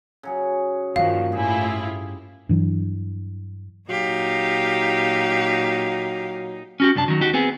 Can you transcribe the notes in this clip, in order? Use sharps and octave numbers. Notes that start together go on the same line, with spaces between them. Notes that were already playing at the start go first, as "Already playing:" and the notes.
C#3 F#3 G#4
G2 A#2 D#3 F3 F#4 F5
A2 E4 F4 G4 G#4
G2 E3 F#3
A#2 F#3 D#4 G4 F5
C#4 F#4 G4
C2 F#2 D4 A5
D#3 F#3
D#2 D#4 F#4 G4
B3 C4 G#4